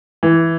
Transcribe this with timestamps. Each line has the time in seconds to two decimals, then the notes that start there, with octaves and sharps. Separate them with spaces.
0.23 E3